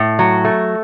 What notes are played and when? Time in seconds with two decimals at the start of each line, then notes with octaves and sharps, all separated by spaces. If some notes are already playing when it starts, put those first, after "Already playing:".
Already playing: A2
0.19 F#3
0.45 A3